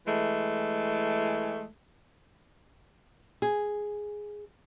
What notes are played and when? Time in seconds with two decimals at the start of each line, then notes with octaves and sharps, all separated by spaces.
0.07 E3 G#3 A3
3.42 G#4